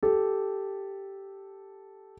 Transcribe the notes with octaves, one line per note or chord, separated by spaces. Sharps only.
G4 A4